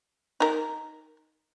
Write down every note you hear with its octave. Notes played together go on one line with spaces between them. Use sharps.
D#4 A#4